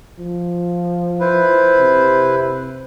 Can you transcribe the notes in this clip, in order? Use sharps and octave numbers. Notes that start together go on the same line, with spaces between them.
F3
E4 B4 C5
C3